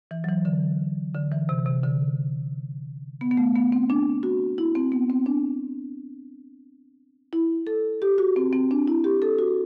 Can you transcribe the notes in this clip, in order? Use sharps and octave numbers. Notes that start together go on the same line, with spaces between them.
E3
F#3
E3
D3
D3
E3
C3
C3
D3
B3
B3
A3
B3
C4
D4
F#4
E4
C4
B3
C4
D4
E4
A4
G4
F#4
C4
C4
D4
E4
G4
A4
F#4